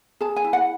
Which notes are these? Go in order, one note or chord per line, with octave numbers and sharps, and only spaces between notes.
G#4 A5
G#5
E4
F#5